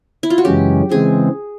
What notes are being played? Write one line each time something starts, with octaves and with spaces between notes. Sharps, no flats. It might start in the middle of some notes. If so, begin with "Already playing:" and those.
E4
F4
F#4
F#2 C#3 E3 G#3 C#4 G4
C#3 E3 G#3 C4 G#4